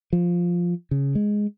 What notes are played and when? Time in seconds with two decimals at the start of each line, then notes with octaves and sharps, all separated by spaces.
0.13 F3
0.91 C#3
1.15 G#3